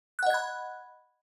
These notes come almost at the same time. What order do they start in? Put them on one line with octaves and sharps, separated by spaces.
F#6 F#5 D#5 G#6 B5